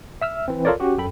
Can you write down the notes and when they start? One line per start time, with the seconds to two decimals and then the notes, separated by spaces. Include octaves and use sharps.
0.22 E5 E6 F6
0.48 E3 C4
0.65 F4 A4 A#4 C#5 D5
0.80 C#4 F#4 G4
0.98 F#2 A4 G5 B5